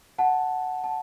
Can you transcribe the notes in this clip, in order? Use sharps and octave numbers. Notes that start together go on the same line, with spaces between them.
F#5 A5
A5